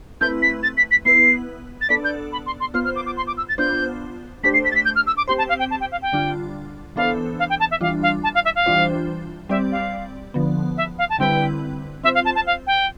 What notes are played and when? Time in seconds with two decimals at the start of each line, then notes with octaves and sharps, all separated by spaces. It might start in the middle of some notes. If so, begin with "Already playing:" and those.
0.21 A3 C4 E4 B4 G6
0.42 B6
0.63 A6
0.77 B6
0.91 B6
1.05 B3 E4 B4 C7
1.81 A6
1.89 B3 D4 A4 D5 B6
2.04 G6
2.32 B5
2.46 C6
2.60 C6
2.74 B3 F4 C5 F6
2.84 F6
2.95 D6
3.06 D6
3.16 C6
3.27 D6
3.37 E6
3.48 A6
3.58 B3 D4 F4 C5 G6
4.43 A3 D4 G4 C5 B6
4.53 C7
4.64 B6
4.71 A6
4.75 B6
4.85 G6
4.95 F6
5.06 E6
5.17 D6
5.28 C4 G4 C5 C6
5.38 A5
5.48 F5
5.59 G5
5.70 A5
5.80 G5
5.91 F5
6.02 G5
6.13 D3 G3 D4 F4
6.96 E3 B3 D4 A4 C5 F5
7.39 F5
7.49 G5
7.59 A5
7.70 E5
7.81 E3 G3 D4 F4 F5
8.02 F5
8.23 A5
8.34 F5
8.44 E5
8.55 F5
8.66 E3 G3 D4 F4 C5
9.49 G3 C4 G4 D5 E5
9.71 F5
10.34 D3 F3 B3
10.77 E5
10.98 F5
11.09 A5
11.19 D3 G3 C4 E4 B4 G5
12.03 C4 F4 C5 E5
12.14 F5
12.25 A5
12.35 A5
12.46 F5
12.67 G5